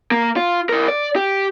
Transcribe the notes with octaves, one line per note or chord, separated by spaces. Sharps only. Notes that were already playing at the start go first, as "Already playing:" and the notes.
A#3
F4
E4 A#4
D5
G4